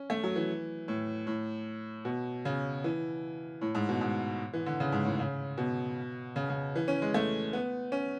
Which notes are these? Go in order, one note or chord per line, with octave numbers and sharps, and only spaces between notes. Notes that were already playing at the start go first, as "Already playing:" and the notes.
Already playing: C#4
A3
F#3
E3
A2
A2
B2
C#3
E3
A2
G#2
B2
G#2
E3
D3
C#3
G#2
A2
C#3
B2
C#3
C#3
E3
C#4
G#3
A3
B3
C#4